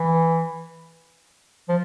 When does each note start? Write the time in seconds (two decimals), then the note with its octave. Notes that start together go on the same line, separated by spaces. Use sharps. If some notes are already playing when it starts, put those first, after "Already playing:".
Already playing: E3
1.69 F3